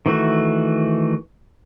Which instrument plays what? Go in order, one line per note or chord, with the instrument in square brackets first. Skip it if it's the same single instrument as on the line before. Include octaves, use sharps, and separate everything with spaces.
[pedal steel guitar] D#3 E3 A3 F#4